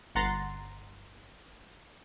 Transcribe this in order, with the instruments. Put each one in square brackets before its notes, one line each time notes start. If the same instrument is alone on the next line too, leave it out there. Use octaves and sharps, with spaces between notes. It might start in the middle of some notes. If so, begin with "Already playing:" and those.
[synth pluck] G1 F#5 A#5 C6 A6